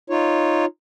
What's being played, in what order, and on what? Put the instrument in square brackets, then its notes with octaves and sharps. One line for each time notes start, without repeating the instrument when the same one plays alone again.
[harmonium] D#4 F4 C#5